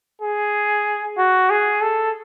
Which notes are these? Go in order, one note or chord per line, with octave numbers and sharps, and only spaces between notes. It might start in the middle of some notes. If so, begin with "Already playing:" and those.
G#4
F#4
G#4
A4